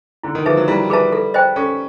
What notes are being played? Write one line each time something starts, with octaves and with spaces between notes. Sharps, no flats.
D3 E4
D#3
F3 G#4 B4 E5 A5
F#3
G3 E4
G#4 B4 E5 A5
A4
C5 D#5 G5
C#4 A4